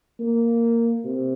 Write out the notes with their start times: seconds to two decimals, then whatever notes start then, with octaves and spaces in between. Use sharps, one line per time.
0.20 A#3
1.04 C3